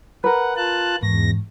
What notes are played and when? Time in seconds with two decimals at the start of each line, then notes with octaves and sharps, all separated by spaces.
0.24 A#4 B4 F#5
0.57 F4 A5 F#6
1.03 E2 G#2 A#6